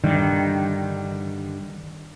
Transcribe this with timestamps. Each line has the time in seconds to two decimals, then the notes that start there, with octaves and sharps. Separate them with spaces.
0.04 G2 D3 D#3 G3